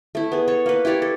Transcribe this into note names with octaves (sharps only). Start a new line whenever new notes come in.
A3 E4
B3 G#4
A4 C#5 C#6
A#3 B4
E4 G4 C#5 D5
A4